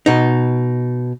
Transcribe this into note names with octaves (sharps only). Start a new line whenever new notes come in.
B2 D#4